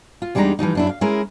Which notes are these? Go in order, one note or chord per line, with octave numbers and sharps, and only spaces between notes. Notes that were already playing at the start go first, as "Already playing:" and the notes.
F4
E2 G3 G#3 D4 D#4 A#5
E3 F3 G3 D#4
F#2 D4 E4
F5
G#3 C#4 E4 G#4 A#4